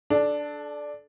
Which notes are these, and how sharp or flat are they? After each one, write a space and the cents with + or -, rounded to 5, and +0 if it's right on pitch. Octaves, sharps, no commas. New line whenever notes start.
D4 +0 A4 -30